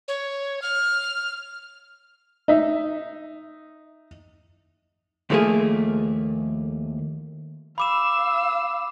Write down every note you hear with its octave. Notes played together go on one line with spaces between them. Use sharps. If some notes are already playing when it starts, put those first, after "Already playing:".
C#5
F6
D#4 E5
D#2 F3 A3 A#3 G#4
F5 B5 D6 E6 E7